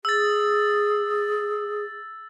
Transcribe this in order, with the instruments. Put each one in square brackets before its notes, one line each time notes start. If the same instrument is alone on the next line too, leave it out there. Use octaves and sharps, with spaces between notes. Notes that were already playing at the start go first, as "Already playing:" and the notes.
[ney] G#4 [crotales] E6 A6